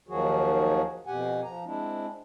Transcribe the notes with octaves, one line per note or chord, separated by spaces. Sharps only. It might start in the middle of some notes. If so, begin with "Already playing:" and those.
D#2 D#3 F3 F#3 F#4 G#4
F2 B2 G4 F#5 G#5
F3 A#5
G#3 C4 D4 E4